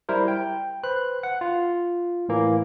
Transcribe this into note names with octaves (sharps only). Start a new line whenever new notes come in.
G3 E4 A#4 C5
G5
B4 C5 F#6
F#5
F4
A2 E3 A#3